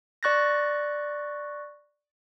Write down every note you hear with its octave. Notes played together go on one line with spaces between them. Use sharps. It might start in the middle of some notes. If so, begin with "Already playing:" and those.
D5 C#6 F#6 A6 A#6